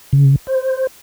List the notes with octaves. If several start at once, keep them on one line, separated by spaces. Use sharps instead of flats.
C#3
C5